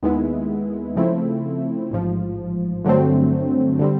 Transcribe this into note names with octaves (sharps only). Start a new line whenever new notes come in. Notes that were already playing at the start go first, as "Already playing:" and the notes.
D#2 D#3 G#3 B3 E4
C#3 F3 A3 C4 E4
A1 G#2 F3
G2 D3 F#3 A3 C4
D3 G3 C4